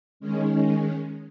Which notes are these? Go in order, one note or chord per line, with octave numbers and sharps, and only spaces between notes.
D#3 G#3 C#4